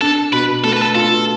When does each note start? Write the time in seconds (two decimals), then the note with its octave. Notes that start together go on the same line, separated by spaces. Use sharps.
0.01 D4 A4
0.33 B2 B4
0.64 A3 A4
0.73 B4
0.82 A4
0.95 F4 A4